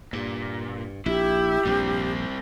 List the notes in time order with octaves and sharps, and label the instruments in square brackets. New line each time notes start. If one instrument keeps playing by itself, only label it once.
[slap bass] G2 [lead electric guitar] A#2
[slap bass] A#1 [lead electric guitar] E4 [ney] G4
[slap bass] A#1 G2 [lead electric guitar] G3 C4